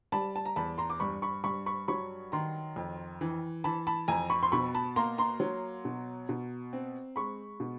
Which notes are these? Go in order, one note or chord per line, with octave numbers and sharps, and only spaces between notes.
G3 A5 B5
A5
A#5
E2 A5 B5
A#5 C6
D6
G2 B5 C#6
B5 C#6
G2 B5 C#6
B5 C#6
F#3 B5 C#6
D#3 A#5 C6
F2
E3
E3 A5 B5
A5 B5
F2 G#5 A#5
B5 C#6
C6
B2 B5 C#6
A5 B5
A#3 A#5 C6
A#5 C6
F#3
B2
B2
C4
G#3 B5 C#6
B2